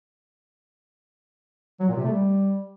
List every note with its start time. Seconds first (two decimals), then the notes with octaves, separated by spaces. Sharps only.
1.80 F#3
1.88 A#2
1.96 C3
2.04 A3
2.12 G3